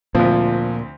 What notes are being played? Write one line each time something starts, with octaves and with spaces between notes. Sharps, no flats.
D2 A#2 F3 C4